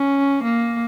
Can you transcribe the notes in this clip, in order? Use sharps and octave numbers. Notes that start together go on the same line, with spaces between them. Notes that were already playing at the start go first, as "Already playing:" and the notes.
Already playing: C#4
A#3